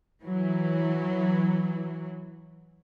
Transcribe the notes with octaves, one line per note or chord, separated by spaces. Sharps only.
E3 F#3